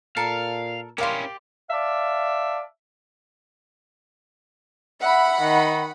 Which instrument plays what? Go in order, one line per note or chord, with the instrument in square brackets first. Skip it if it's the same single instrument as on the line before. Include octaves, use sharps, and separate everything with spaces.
[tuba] A#2 [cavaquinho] A4 A#4 A5 [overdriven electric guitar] F5
[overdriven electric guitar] C#4 E4 [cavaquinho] G4 D5 C6 [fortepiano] A#4 F5
[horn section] D5 E5 F5 A5
[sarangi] E5 [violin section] F#5 B5
[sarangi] D#3